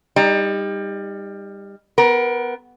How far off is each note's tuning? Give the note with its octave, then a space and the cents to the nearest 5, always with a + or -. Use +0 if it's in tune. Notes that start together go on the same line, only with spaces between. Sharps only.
G3 +25 D#4 +0
B3 +10 A#4 +30